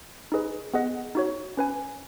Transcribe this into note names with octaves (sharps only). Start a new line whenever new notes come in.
D#4 G#4 B4 D#5
B3 G#4 D#5 F#5
D#4 F#4 C#5
C#4 B4 G#5